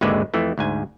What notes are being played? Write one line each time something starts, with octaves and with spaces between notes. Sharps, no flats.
G#1 D#2 D3 G#3 B4 E5
F2 E3 A3
D2 G#2 G#5